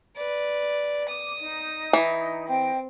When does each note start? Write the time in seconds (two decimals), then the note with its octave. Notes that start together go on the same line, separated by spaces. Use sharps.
0.16 B4 D5
1.09 D6 D#6
1.41 D#4
1.93 E3
2.48 C4 D#5 G5